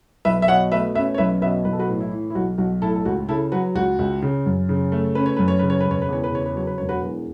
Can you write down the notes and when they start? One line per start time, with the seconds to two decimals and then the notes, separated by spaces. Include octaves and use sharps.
0.25 B1 B4 E5
0.42 E5
0.48 B2 C#5 F#5
0.72 A3 B4 E5
0.95 C#4 B4 E5
1.15 C#5
1.18 B1 B4 E5
1.42 B2 B4 E5
1.65 B1 B4
1.73 A4
1.79 F#4 B4
1.88 A2
2.01 E4
2.11 E3
2.30 E4
2.35 B1 F#4
2.58 B1 F#4
2.82 A2 E4 A4
2.96 A4
3.05 C#2 F#4
3.29 C#3 E4 A4
3.52 F#3 F#4 B4
3.75 C#2 F#4
3.99 C#2
4.22 C#3
4.46 F#2
4.69 C#3
4.92 A3
5.15 C#4 B4
5.26 C#5
5.37 F#2 B4
5.48 C#5
5.59 C#3 B4
5.70 C#5
5.80 E1 B4
5.91 C#5
6.02 B4
6.08 E2 C#5
6.24 B4
6.32 C#3 C#5
6.46 B4
6.56 F#3 C#5
6.67 B4
6.78 E1 C#5
6.89 F#4 B4
7.02 E2